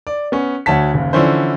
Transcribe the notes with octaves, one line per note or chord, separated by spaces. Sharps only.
D5
B3 C#4
D2 F#4 C#5 A5 B6
F#1 D#2
D3 E3 F3 C#4 E4 C5